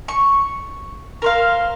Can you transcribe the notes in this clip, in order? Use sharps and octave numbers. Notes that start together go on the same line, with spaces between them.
C#6
A#4 C5 F5